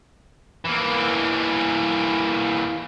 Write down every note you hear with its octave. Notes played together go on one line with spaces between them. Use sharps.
E3 A#3